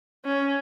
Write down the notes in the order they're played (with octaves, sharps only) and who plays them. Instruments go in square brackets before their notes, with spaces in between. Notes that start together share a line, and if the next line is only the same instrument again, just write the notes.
[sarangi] C#4